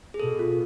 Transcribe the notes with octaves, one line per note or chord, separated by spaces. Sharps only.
G#4
B2 A4
F4